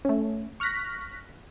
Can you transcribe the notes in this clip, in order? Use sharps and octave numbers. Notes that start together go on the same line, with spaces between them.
A3 C#4
C#6 F6 F#6 A#6 B6